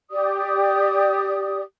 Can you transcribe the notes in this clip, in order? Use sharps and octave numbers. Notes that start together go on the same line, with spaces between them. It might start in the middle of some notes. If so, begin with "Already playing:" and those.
G4 D5 D#6